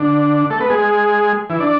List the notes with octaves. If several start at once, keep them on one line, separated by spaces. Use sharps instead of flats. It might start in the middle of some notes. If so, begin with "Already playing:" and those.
Already playing: D3 D4
A3 A4
B3 B4
G#3 G#4
E3 E4
D4 D5